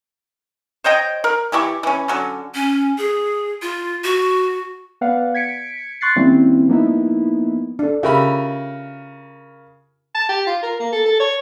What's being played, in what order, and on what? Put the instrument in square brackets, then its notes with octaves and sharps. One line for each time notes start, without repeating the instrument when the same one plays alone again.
[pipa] C5 C#5 D#5 G5
A#4
E3 E4 G4 C#6
E3 C#4
D3 F#3 C#4
[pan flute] C#4
G#4
F4
F#4
[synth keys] B3 B4 D5 F5 F#5
G#6 B6 C#7 D7
C6 C#6 F#6 A6 C7 C#7
D#3 G3 A#3 C4 C#4 E4
F3 A#3 B3 D#4 E4
[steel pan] D4 A4
[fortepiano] C#3 A#4 B5 [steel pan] F4 G4 E5
[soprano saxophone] A5
G4
F4
A#4
A#3
A4
A4
C#5